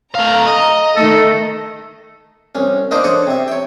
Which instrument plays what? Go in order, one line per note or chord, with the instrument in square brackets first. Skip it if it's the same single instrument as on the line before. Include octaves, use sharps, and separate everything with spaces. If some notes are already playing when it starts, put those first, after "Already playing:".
[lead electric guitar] A3 F5 [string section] A#5
[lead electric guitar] D#5
[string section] D#3 A3 [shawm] A4
[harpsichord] C2 C#4
A#3 D4 D#4 C5 D5 D#5
A4 C5 C#5 D#5 F#5
C3 E5
C#5 G5